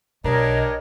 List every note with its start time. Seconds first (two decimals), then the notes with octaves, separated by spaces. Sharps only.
0.24 B1 D4 G4 A#4 C#5 D#5